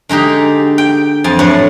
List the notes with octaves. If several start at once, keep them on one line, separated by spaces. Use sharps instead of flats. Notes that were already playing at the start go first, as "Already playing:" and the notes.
D3 G#3 D#4 G4
G5
F2 G#5 A5
A2 F#3 D4 C#5